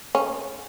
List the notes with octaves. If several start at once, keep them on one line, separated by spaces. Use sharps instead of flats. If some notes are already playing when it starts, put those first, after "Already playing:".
C#4